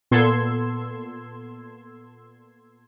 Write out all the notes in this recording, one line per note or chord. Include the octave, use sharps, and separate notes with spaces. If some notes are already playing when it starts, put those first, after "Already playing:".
A#2 B3 A4 C6 E6 G#6